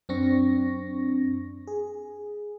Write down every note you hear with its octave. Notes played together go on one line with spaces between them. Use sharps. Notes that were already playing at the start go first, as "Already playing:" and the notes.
F#2 C4 D4 C#6 A#6
G#4